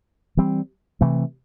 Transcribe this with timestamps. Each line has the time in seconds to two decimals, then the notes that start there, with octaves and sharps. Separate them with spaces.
0.37 E3 G3 C4
1.01 C3 E3 A3